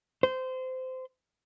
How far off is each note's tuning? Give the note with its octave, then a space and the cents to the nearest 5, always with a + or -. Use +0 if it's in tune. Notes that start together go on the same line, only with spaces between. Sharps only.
C5 -20